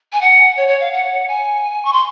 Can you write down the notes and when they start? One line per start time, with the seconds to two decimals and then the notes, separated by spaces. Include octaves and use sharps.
0.12 G#5
0.21 F#5
0.57 C#5
0.68 C#5
0.80 F5
0.92 F#5
1.28 G#5
1.85 C#6
1.93 C6